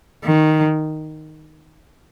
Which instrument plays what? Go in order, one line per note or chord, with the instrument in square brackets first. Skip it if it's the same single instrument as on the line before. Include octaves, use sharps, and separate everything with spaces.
[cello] D#3